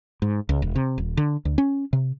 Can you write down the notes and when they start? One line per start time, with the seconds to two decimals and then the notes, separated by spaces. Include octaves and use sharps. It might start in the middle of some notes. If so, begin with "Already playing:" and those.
0.22 G#2
0.49 C#2
0.62 E1
0.76 C3
0.98 D#1
1.17 D3
1.45 D2
1.58 C#4
1.93 C3